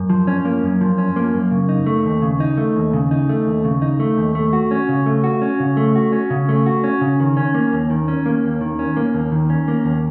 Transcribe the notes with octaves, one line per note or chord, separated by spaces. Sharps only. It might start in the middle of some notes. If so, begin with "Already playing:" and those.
Already playing: F#2
F3
C#4
A#3
F#2
F3
C#4
A#3
F#2
C#3
D#4
A3
D#2
C#3
D#4
A3
D#2
C#3
D#4
A3
D#2
C#3
D#4
A3
D#2
A3
F#4
C#4
C#3
A3
F#4
C#4
C#3
A3
F#4
C#4
C#3
A3
F#4
C#4
C#3
D#3
C#4
A#3
D#2
D#3
C#4
A#3
D#2
D#3
C#4
A#3
D#2
D#3
C#4
A#3
D#2